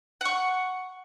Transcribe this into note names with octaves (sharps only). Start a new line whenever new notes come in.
F#5 C#6